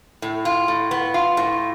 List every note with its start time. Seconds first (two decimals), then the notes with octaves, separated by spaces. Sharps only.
0.22 A2
0.45 F4
0.68 A2
0.91 B3
1.14 F4
1.37 A2